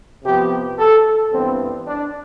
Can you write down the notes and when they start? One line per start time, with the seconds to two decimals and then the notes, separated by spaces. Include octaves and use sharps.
0.24 C3 F3 B3 G4
0.78 A4
1.32 G2 E3 B3 C4
1.87 D4